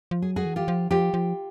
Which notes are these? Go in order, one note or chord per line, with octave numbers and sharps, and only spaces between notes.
F3
F#3 G#4
F#4 G#4
E3
F4 G4
F3
F3 F4 G4
F3